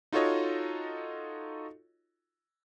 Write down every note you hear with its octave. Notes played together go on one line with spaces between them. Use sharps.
D#4 F4 F#4 A4 C#5 D#5